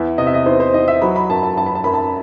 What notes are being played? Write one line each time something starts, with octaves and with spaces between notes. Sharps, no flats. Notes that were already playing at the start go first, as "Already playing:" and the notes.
Already playing: E2 E5
C3 D#5
E5
D#5
E2 C5
C5
E2 D#5
E5
F#3 B5
B5
F#2 A5
A5
F#2 A5
B5
A5
F#2 B5
A5